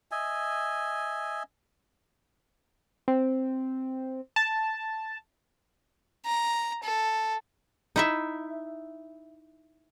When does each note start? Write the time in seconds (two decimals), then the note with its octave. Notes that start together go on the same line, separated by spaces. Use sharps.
0.11 D#5 E5 G#5
3.08 C4
4.36 A5
6.25 A#5
6.83 A4
7.96 D#4 E4 E5